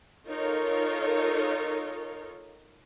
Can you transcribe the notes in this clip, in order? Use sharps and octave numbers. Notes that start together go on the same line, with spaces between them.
D#4 F4 A4 A#4 C#5